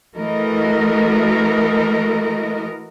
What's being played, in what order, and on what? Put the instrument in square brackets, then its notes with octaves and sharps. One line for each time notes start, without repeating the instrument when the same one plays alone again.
[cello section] E3 A3 F#4 A#4 D#5